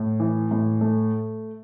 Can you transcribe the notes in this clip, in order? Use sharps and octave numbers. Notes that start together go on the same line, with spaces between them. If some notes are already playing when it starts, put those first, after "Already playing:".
Already playing: A2
E3
A2
A3